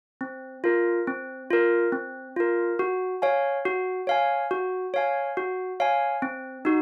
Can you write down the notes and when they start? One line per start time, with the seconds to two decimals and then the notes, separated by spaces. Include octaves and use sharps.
0.21 C4
0.64 F4 A#4
1.07 C4
1.50 F4 A#4
1.92 C4
2.36 F4 A#4
2.79 F#4
3.22 C#5 F5 G#5
3.65 F#4
4.07 C#5 F5 G#5
4.51 F#4
4.94 C#5 F5 G#5
5.37 F#4
5.80 C#5 F5 G#5
6.22 C4
6.65 D#4 F#4